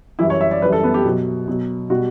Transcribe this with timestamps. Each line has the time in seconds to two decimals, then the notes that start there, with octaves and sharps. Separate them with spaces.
0.19 F#2 E3 G3 E4
0.30 C#5
0.41 E5
0.51 D5
0.62 F#2 E3 G3 B4
0.72 A4
0.83 B3
0.94 G4
1.04 B2 F#3
1.48 B2 F#3
1.90 B2 G3 F#4